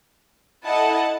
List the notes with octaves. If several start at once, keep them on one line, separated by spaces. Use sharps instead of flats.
E4 A4 D#5 F#5 A5